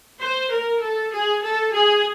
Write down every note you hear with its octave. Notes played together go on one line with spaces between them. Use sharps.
C5
A#4
A4
G#4
A4
G#4